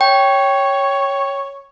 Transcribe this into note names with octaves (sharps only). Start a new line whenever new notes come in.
C#5 G5